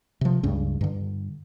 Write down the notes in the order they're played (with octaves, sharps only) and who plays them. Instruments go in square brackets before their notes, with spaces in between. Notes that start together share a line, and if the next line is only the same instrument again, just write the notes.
[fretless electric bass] C3 F3
C#2 G2 C#3 C#4
G2 D3